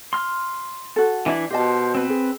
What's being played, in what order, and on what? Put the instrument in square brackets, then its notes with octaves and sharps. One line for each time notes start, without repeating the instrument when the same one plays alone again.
[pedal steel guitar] C6 F6
[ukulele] F#4 A4
[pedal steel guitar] E3 D4 E4
[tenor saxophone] B2 [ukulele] G4 D#5 A5 [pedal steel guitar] C5
[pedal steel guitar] C4 B4
[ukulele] G#4